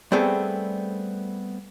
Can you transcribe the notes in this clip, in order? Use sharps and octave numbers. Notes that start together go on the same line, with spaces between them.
G3 A3 B3 C4 G#4 A4